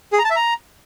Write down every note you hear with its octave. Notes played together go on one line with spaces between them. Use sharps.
G#4
A#5
A5
E5
A#5